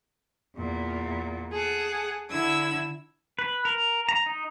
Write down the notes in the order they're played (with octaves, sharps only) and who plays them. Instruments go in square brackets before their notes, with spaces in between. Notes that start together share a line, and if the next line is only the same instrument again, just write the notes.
[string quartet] E2 A#2
G#4 A4 F#5
D3 E4 E6 G#6
[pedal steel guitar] B4
A#4
A#5
D#4